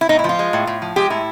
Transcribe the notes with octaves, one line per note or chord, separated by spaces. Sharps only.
E4
A2 D#4
E4
F3
F4
G#3
A2
A2
F3
G#3 G4
A2 E4